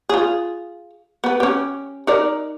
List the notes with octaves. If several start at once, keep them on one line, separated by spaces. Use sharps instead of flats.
F4 G#4
B3 B4
C#4 G4
D#4 A#4 D5